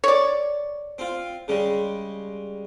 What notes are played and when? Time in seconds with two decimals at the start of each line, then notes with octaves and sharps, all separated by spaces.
0.04 C#5 D5
0.98 C4 F4
1.48 C#3 G3 G#3